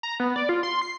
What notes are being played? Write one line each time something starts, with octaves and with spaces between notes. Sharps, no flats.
A#5
B3
D5
F4
C6
C7